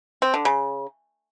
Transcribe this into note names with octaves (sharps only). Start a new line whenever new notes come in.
C4
D3
C#3